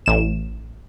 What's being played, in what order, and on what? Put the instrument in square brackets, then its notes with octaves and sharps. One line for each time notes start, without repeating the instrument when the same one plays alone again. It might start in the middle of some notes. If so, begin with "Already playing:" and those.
[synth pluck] A1 E7